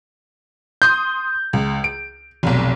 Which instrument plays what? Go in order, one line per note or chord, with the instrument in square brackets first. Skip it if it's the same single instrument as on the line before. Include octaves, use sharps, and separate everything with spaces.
[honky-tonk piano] C6 D#6 [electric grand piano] G6
[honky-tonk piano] C#2
D7
F1 B1